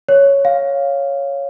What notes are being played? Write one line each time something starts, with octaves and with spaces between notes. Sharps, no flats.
C#5
F5